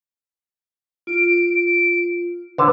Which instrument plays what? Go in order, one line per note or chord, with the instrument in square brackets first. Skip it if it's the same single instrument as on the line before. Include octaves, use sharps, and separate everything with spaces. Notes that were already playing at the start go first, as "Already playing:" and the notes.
[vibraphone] F4 [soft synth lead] D7
[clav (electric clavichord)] D3 C#5 A5 [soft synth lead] B4